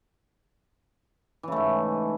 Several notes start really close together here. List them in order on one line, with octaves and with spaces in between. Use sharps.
E3 C#3 A3 G#2